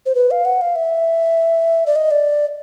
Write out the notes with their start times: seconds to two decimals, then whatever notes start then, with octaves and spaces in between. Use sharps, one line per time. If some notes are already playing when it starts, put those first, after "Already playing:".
0.06 C5
0.15 B4
0.31 F5
0.45 F#5
0.61 F5
0.76 E5
1.86 D5
1.96 D#5
2.11 D5